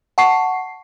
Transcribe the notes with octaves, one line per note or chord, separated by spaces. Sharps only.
F#5 A5 C#6 C7